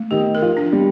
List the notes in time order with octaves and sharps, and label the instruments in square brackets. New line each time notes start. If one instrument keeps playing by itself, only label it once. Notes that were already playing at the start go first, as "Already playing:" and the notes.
Already playing: [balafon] A3
[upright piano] D#3 D#4 [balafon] G4
[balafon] A#4
[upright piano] F3 F4
[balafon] D4
[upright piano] G3 G4